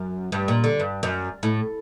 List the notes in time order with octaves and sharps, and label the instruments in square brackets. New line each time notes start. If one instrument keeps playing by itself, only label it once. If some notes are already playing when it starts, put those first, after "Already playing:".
Already playing: [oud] F#2
G2
A#2
D3
G2
F#2
A2